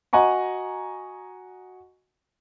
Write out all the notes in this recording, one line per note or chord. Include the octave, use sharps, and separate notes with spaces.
F#4 D#5 F#5 G#5 A#5 C#6